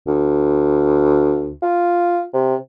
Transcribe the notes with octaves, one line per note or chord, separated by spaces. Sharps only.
D2
F4
C3